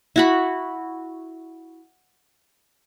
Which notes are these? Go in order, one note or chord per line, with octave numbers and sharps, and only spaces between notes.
E4 F#4 B5